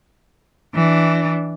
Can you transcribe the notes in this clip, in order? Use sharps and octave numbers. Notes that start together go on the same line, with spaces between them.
E3 D4